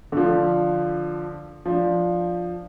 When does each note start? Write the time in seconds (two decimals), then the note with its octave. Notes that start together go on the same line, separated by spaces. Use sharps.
0.12 D3 F3
1.65 F3 D4